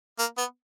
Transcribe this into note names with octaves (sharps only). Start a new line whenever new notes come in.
A#3
B3